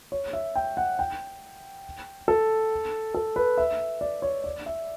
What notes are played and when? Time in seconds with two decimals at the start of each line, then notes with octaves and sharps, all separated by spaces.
0.12 C#5
0.33 E5
0.56 G5
0.77 F#5
0.99 G5
2.28 A4
3.14 A4
3.36 B4
3.58 E5
4.01 D5
4.22 C#5
4.44 D5
4.66 E5